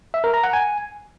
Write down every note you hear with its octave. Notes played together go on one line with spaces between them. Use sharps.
E5
A#4
A#5
F#5
G#5